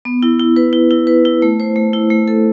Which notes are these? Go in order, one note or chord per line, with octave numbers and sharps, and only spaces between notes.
B3
E4
E4
B4
E4
E4
B4
E4
A3
C5
A3
E4
A3
A4